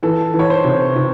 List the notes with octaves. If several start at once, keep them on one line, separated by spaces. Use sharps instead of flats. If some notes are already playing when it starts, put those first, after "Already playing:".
E3 A4
E3
C#5
C5
C3
C3